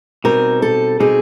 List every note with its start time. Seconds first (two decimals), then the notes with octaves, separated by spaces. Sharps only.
0.24 B2 G3 C4 D#4 A#4
0.62 A4
1.00 B2 G3 C4 D#4 G#4